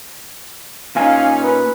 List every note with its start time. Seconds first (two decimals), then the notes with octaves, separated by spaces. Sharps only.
0.96 A#2 C#4 D#4 F5 G#5
1.43 B4